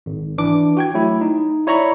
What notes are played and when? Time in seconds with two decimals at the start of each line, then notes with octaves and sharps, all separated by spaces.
0.06 G#1
0.38 E3 D4 D6
0.77 F#4 G5 G#6
0.94 F#3 A3 E4
1.21 D#4
1.67 E4 C#5 D5 A#5 B5 C#6